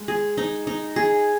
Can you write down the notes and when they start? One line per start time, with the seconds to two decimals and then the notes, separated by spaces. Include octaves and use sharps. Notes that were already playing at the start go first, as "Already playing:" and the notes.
Already playing: G#3
0.08 G#4
0.37 D#4
0.67 D#4
0.96 G#4